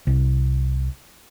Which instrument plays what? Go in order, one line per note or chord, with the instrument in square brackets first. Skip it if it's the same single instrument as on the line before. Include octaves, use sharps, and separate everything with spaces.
[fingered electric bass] C2